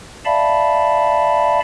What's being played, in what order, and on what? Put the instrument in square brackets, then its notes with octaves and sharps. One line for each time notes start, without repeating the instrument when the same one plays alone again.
[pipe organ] D5 E5 F5 A5 B5